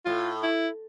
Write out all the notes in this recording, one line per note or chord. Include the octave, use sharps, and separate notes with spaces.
A2 F4
E4